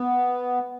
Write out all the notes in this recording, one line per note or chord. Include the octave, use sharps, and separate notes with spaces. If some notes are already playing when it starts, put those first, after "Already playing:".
Already playing: B3